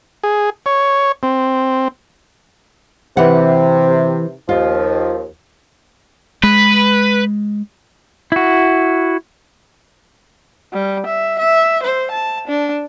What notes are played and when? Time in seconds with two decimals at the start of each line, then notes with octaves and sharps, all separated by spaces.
0.24 G#4
0.66 C#5
1.23 C4
3.17 C3 E3 F#5
4.49 D#2 F3 F4
6.43 G#3 B4
8.32 E4 F#4
10.73 G3
11.06 E5
11.39 E5
11.83 C5
12.11 A5
12.47 D4